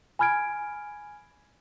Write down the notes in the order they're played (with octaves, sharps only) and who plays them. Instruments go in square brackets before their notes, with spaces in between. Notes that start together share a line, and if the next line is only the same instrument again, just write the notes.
[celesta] G#5 B5 F6 G#6 D7